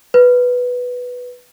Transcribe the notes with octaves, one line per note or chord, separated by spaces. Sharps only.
B4